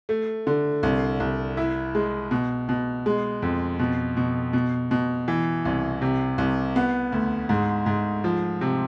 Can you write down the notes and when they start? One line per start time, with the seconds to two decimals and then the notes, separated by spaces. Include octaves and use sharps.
0.09 A3
0.47 D3
0.83 C2
1.20 C2
1.57 E4
1.95 G#3
2.31 B2
2.69 B2
3.06 G#3
3.42 F2
3.79 B2
4.17 B2
4.53 B2
4.91 B2
5.28 E3
5.65 C2
6.02 C3
6.38 C2
6.76 B3
7.12 D2
7.49 G#2
7.86 G#2
8.24 F3
8.61 C3